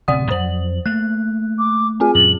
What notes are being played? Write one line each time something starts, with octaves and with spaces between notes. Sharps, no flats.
D1 C3 D5 F#5 D#6
F2 F#3 C5 F#7
A3 A#3 F#6
D6
C4 F4 G#4 G#5
F#2 A#2 F#7